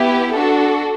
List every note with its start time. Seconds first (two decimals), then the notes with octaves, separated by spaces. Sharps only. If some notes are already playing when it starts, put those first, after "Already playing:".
Already playing: B3 E4 G4
0.33 D4 F#4 A4